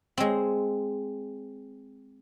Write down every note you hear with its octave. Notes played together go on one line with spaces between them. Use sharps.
G#3 C4